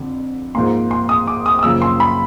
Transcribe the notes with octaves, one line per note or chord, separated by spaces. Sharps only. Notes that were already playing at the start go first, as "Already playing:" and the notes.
Already playing: F2 D3
G#2 F3 A#3 C6
C6
D#6
D6
D#6
D#6
F#2 C#3 F3 A#3 E6
C6
B5